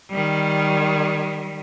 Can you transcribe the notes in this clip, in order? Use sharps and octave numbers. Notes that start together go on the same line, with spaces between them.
D#3 G3